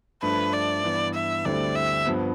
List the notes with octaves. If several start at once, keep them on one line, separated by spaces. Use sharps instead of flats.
G2 F3 A3 D4 B4
D5
G2 E3 B3
E5
D2 D3 G3 C4 E4 D5
E5
G2 F3 B3